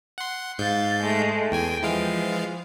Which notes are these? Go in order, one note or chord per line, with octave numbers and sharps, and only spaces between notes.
F#5 C6
G#2 F5 G6 A6
G#3 A3
E2 G5 G#5
E3 F3 G#3 F5